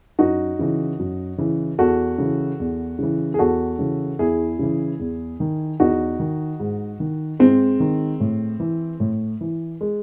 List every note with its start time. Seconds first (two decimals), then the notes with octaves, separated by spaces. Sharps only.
0.19 F#2 D#4 F#4
0.59 C#3 E3
0.99 F#2
1.38 C#3 E3
1.79 E2 F#4 A4
2.18 C#3 E3
2.60 E2
2.99 C#3 E3
3.34 G#4
3.39 E2 F#4 A4
3.79 C#3 E3
4.19 E2 E4 G#4
4.59 C#3 E3
5.00 E2
5.40 D#3
5.80 E2 D#4 F#4
6.20 D#3
6.60 G#2
7.00 D#3
7.39 G#2 G#3 C4
7.80 D#3
8.20 A2
8.60 E3
9.00 A2
9.41 E3
9.81 G#3